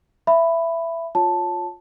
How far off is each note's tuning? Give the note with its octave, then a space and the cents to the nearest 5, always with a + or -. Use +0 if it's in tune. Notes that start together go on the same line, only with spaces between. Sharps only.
E5 +15 B5 +5
F4 +20 C#5 +0 A5 +0